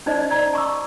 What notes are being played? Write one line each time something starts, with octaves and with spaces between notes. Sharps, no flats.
C#4 D#4 C5 D5 D#5
D5 A#5
A5 C#6 D6 E6